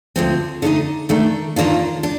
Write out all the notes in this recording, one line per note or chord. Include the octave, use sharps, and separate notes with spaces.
D2 D3 F3 C4
D3 A3 D#4 A4 D#5
D#3 A3 D4
D#2 D#3 A#3 D4 F4
D4